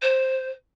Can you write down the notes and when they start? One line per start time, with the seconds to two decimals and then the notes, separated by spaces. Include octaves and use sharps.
0.02 C5